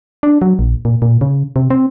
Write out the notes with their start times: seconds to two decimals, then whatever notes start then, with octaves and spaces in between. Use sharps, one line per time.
0.23 D4
0.42 F#3
0.59 A#1
0.85 A#2
1.02 A#2
1.21 C#3
1.56 C3
1.70 C4